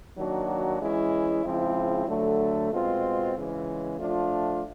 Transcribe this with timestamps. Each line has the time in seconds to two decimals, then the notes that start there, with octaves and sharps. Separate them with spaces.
0.17 D#3 F#3 A#3 D4 F#4
0.80 E3 G#3 C#4 E4
1.44 C#3 F3 G#3 C4 E4
2.08 D3 F#3 A3
2.71 B2 G#3 C4 F4
3.35 C#3 E3 G#3
3.99 F3 A3 D4 F4